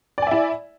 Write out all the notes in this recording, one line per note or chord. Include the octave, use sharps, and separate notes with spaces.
E4 D5 E5 G#5